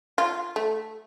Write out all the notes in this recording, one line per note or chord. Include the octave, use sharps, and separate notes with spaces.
F4
A3